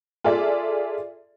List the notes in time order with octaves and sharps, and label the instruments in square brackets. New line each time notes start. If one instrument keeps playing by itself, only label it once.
[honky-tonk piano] F4 G#4 A4 D5 E5